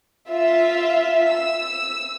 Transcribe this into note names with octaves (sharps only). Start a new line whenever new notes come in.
F4 E5
E6